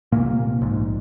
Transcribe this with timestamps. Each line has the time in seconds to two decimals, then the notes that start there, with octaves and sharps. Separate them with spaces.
0.12 C2 A#2 A#3
0.61 A#1 G#2